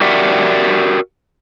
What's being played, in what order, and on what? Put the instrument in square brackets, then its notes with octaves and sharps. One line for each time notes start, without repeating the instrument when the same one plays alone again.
[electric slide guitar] F#4 G4 A#4 D5 E5 F#5